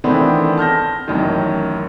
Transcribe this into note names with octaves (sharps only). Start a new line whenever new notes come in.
D#3 E3 A3 B3 C4 D4
A5 F6 G6 A#6
A1 F#2 D#3